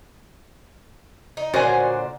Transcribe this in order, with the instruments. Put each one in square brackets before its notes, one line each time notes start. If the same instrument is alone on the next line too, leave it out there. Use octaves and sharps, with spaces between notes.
[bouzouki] D#4
[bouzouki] A#2 D3 C5 [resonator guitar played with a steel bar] F#4 C#5 G#5